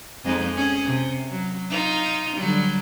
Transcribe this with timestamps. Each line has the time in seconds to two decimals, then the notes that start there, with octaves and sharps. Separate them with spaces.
0.25 F2 G#3 D#4
0.55 C#4 G#4
0.84 C3
1.29 F#3
1.70 D#4 F4
2.37 D3 F#3 G3